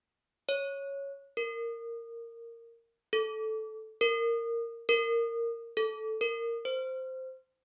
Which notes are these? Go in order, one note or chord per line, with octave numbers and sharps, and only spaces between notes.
C#5
A#4
A4
A#4
A#4
A4
A#4
C5